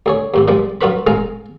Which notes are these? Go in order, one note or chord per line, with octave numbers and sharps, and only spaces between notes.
D2 G#4 C#5
D#2 G#2 C3
A#2 F3 G3 G#3
F#2 F4 F#4 A#4 B4 B5
A1 G#3 G#4 F5 A#5